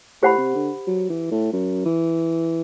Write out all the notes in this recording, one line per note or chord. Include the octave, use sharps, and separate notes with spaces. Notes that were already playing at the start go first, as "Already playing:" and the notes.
A2 G4 C5 F#5 B5
C3
D3
F#3
E3
A2
F#2
E3